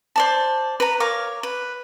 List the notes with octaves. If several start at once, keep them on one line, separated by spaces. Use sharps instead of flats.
C5 D5 A5
B4 A#5
A#4 C#5 F5 D6
B4